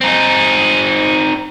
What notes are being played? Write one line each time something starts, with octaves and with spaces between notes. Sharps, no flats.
C4 D#4